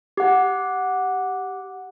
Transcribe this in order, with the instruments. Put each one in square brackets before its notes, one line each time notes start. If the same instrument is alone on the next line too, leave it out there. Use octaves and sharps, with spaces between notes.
[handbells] G4 F#5